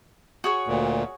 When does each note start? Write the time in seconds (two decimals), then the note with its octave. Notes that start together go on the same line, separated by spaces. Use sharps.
0.44 F#4 G#4 C#5
0.67 D2 A#2